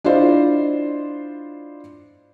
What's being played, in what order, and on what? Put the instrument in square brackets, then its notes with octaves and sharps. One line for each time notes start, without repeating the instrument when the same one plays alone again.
[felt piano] D4 E4 F4 C5 D#5